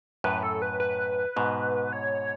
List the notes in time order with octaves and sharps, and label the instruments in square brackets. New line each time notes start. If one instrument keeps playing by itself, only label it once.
[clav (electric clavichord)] F#2 A2 [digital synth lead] B4
[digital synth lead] A4
B4
B4
[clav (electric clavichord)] G#2 B2
[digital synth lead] C#5